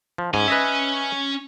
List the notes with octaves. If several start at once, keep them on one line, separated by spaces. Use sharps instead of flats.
F3
G#2 C#4 G#5
B4 D#5 E5